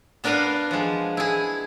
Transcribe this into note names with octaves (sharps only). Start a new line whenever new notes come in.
B3 D4 A#4 B4 F5 F#5
F3 G#3
E4 G#4